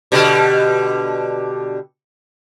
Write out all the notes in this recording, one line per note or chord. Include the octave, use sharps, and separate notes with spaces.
B2 D3 G3